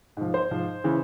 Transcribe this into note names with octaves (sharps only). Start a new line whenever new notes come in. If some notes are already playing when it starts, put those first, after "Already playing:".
G#2 F3
C5
G#2 F3
C#3 E3